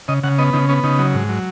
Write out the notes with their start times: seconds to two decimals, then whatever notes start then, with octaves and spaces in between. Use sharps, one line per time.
0.08 C#3 D#5
0.23 C#3 F#5
0.38 B3 D#5
0.53 C#3 D#4
0.69 B3 C#4
0.84 C#3 D#4
0.99 F#3
1.14 G#2
1.29 F#3